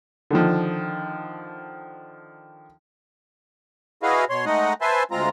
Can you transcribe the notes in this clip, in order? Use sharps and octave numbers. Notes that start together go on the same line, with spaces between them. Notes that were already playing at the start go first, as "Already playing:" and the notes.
D3 D#3 F3
E4 F#4 G#4 B4 D#5 F5
B2 C#5 C6
G#3 A3 D#4 D#5 F#5
B4 C5 E5 G#5 A5 C6
D2 G#3 C4 F4 A#5